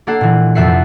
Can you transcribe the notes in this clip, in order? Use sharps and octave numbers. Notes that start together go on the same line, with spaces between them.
A#3 D4 A4 F#5 C7
A#2 E3
F2 C3 B3 E5 F#5 C7